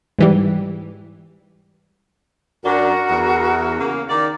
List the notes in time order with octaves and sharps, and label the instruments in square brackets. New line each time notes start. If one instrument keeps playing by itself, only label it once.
[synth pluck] G#2 E3 G3
[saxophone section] F#2 D4 [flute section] F#4 A#4 F#5
[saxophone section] E2
C#3 A#3
D#3 D5